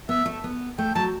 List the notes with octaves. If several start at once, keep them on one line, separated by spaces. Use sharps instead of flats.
B3 E5
A3
B3
A3 G5
F#3 A5